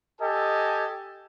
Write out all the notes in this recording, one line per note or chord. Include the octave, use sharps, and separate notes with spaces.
G4 A4 D#5 G#5